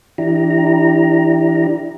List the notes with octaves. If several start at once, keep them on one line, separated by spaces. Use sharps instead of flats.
E3 D4 E4 G4 A#5